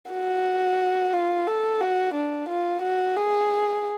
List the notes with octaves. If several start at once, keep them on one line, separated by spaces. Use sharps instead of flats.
F#4
F4
A4
F#4
D4
F4
F#4
G#4